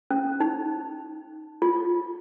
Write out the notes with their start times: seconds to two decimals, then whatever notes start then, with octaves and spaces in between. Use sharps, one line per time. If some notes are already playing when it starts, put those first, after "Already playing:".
0.11 C#4
0.40 D#4
1.62 F4